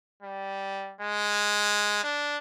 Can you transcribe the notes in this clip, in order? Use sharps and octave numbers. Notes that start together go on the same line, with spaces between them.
G3
G#3
D4